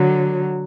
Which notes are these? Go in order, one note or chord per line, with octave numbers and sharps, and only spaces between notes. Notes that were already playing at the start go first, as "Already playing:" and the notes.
Already playing: D3 F#3